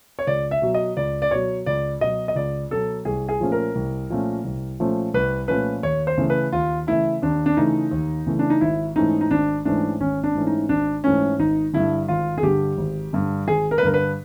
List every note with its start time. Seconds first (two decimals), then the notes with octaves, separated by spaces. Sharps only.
0.19 C#5
0.27 C#2 D5
0.51 E5
0.62 B2 F#3
0.74 D#5
0.97 C#2 D5
1.22 D5
1.31 B2 F#3 C#5
1.66 C#2 D5
2.01 B2 F#3 D#5
2.28 D#5
2.35 C#2 D5
2.71 B2 F#3 A4
3.05 C2 G#4
3.29 G#4
3.40 A#2 F3 A3 C#4
3.52 A#4
3.75 C2
4.10 A#2 F3 A3 C#4
4.45 C2
4.80 A#2 F3 A3 C#4
5.14 C2 B4
5.48 A#2 F3 A3 C#4 B4
5.83 D#2 C#5
6.07 C5
6.18 C#3 E3 A3
6.30 B4
6.53 D#2 F4
6.87 C#3 E3 A3 E4
7.22 D#2 D4
7.46 D4
7.57 C#3 E3 A3 D#4
7.91 D#2
8.27 C#3 E3 A3
8.39 D4
8.50 D#4
8.61 G#1 E4
8.96 G#2 E3 A3 C#4 D#4
9.21 D#4
9.31 G#1 D4
9.65 G#2 E3 A3 C#4 D4
10.00 G#1 C#4
10.23 D4
10.35 G#2 E3 A3 C#4
10.47 D#4
10.69 G#1 D4
11.04 G#2 E3 A3 C#4
11.39 G#1 D#4
11.73 G2 D3 E4
12.08 G#1 F4
12.38 G#4
12.43 G2 D3 G4
12.78 G#1
13.13 G2 D3
13.47 G#1 G#4
13.71 A#4
13.78 B4
13.83 G2 D3 A#4
13.94 B4